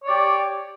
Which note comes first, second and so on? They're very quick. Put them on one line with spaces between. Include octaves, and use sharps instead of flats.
C#5 D5 G4